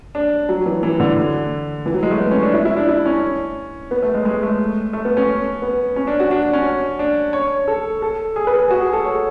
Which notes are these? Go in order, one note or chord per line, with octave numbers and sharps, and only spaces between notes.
D4
F#3
E3
E3
D3
E3
F#3
G#3
A3
B3
C#4
D4
E4
E4
D4
E4
C#4
B3
A3
G#3
G#3
A3
A3
B3
C#4
B3
C#4
D4
F#4
D4
D4
C#4
D4
C#5
A4
A4
G#4
B4
G#4
F#4
G#4
A4
C#5